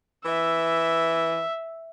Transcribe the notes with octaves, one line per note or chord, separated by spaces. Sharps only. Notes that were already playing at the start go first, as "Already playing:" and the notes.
E3 E5